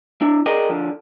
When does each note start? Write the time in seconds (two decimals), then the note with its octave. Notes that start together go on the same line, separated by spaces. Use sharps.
0.21 D4 E4
0.46 G#4 A#4 D5 D#5 G5
0.69 D3 F3